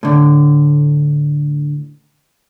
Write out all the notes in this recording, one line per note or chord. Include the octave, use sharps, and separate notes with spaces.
A2 D3